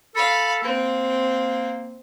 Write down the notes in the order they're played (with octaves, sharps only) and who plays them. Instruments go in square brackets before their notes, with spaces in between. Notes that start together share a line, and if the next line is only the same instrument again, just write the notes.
[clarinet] A4 [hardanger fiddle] F5 B5
[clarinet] A#3 [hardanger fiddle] C4